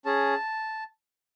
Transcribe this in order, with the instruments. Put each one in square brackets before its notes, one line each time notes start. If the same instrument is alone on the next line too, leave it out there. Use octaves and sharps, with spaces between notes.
[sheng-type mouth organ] C#4 G#4 A5